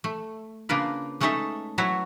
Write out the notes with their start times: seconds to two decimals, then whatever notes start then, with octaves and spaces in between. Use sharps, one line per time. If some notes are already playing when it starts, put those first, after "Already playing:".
0.04 A3
0.69 C#3 A#3 D4 F4 A#4 B4
1.20 G#3 A3 C#4 D#4 A4 E5
1.78 F#3 E4 F#4 B4 C#5